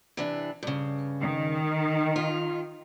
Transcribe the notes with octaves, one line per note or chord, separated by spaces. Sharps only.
C3 E3 D4
G2 C#3
D#3
F4